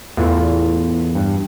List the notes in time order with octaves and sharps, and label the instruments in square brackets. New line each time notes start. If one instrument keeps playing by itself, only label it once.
[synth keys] E2 [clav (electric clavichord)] A2 F4
[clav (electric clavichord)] G2